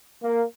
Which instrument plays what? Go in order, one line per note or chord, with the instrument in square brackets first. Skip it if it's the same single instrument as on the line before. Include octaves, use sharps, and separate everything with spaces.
[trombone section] A#3